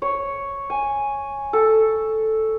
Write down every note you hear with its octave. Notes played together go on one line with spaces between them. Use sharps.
C#5
G#5
A4